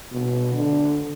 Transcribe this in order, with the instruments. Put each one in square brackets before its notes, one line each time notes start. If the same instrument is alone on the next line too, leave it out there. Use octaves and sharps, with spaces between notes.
[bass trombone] B2
D3